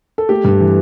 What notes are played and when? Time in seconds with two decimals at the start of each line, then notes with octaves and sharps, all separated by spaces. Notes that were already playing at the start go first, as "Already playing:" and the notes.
0.18 A4
0.29 A3 G4
0.44 G2
0.61 E3